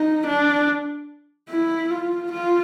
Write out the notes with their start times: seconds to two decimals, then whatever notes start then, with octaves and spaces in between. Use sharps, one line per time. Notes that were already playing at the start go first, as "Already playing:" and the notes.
Already playing: D#4
0.26 D4
1.49 E4
1.91 F4
2.31 F4